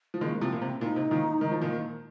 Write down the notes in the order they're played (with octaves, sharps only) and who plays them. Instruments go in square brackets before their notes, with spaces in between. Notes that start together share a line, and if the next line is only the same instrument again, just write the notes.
[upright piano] F3
[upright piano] D#3 G#3 [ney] A#3
[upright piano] C3 F3 [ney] C4
[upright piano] A#2
[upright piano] C3 [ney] C4
[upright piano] A#2 [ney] D#4
[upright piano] C3
A#2 D#3
D#3
F3
A#2 D#3